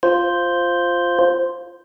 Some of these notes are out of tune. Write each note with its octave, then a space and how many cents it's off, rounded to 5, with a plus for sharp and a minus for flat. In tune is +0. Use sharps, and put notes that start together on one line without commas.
F4 +0 C5 +0